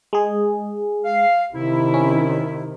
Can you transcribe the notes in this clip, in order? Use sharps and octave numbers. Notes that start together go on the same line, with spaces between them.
G#3 G#4
F5
C3 D#3 E4
C#4